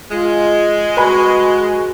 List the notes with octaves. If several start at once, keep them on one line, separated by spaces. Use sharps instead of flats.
G#3 F4
F#4 B4 G#5 B5